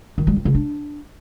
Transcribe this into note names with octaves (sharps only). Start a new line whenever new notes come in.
D#3
G3
C4
C#3
D4